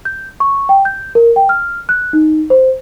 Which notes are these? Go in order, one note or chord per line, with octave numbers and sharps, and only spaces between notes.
G6
C#6
G5
G6
A#4
G5
F6
F#6
D#4
C5